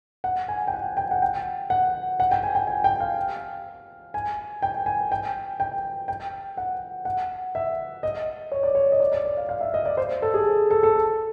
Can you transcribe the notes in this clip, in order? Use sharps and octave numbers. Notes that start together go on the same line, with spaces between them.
F#5
G#5
G5
F#5
G5
F#5
G5
F#5
F#5
G5
G#5
G5
G#5
G5
F5
G#5
G5
G#5
G5
G5
G5
F#5
F#5
E5
D#5
C#5
D5
C#5
D#5
D5
D5
D5
F5
F5
E5
D#5
D5
C5
A4
G#4
A4
A4